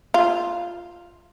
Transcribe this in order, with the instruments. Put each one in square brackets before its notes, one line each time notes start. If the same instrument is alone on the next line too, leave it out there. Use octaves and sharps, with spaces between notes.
[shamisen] F4